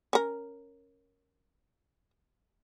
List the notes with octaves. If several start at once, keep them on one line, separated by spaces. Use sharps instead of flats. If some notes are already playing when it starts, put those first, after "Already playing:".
C#4 A#4